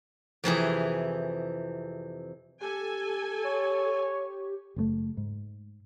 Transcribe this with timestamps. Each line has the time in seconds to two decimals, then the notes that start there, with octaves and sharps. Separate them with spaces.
0.44 F2 C3 E3 G#4
2.61 G4 A4 G#5
3.46 C#5
4.76 F#1 C3 A3
5.17 G#2